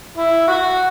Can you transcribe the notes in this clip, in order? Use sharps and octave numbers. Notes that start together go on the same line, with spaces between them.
E4
F#4